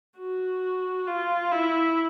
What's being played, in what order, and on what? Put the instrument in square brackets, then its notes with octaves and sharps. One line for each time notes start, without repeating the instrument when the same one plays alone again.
[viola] F#4
F4
E4